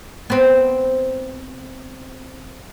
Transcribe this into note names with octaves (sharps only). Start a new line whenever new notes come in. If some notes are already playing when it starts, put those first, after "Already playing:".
B3 C4